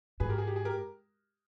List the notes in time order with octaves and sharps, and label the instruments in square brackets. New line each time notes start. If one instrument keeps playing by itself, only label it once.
[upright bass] G#2 [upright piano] G#4 B4
[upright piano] G4 A#4
G#4
G4
G#4
G4 A#4